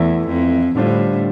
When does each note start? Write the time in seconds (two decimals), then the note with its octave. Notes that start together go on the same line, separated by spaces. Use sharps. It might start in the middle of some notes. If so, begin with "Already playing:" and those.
Already playing: E2 E3 A3 E4
0.28 F2
0.75 A2 D3 G3 D4 F4 C5